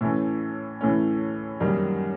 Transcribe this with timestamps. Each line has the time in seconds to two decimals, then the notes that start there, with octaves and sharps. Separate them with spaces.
0.01 A2 E3 A3 C#4
0.81 A2 E3 A3 C#4
1.60 F#2 D#3 G3 A#3